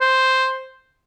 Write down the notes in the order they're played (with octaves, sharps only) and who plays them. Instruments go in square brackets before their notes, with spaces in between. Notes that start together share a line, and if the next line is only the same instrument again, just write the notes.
[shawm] C5